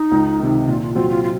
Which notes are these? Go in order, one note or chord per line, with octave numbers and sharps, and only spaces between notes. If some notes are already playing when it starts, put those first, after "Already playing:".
Already playing: D#4
C#2
C3 D#3
A#2 F4
F4
F#3 C4 F4
F4
F4